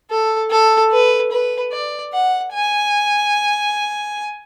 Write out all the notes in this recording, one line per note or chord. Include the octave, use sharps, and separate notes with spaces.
A4
A4
B4
B4
D5
F#5
G#5